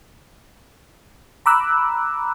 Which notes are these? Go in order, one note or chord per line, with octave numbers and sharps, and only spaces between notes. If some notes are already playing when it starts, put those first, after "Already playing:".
A#5 B5 D6 E6 F#6